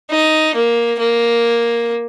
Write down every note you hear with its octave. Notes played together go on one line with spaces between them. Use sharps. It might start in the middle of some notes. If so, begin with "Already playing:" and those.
D#4
A#3
A#3